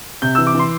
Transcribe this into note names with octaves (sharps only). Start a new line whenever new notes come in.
C3 G6
E3 E6
D6
E3 C6